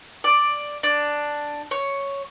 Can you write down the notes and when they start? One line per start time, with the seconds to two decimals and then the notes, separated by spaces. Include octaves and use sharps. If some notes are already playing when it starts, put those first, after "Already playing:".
0.24 D5
0.83 D4
1.71 C#5